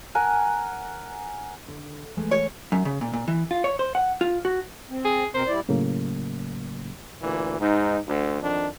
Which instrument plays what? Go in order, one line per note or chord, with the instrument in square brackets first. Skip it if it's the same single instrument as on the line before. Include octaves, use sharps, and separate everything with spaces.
[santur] A#4 F#5 G#5
[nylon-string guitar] D3
E3 G#3 A3
[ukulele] C#5
[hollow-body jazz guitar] F#2
C#3
A#2
A#2
E3
F4
C#5
C5
F#5
F4
F#4
[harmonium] C4
[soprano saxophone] G#4
[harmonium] B2 C4 A#4 [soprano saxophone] C5
[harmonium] G3 E4 D5
[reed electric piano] A2 C#3 F#3 A#3
[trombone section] D2 A#2 E3
G#2 D#4
D2
F2 D#3 D4